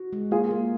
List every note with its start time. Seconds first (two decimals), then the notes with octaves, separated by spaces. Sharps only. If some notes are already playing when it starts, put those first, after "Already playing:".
Already playing: F#4
0.13 G#3
0.31 A#3 F4 G#4
0.51 A#3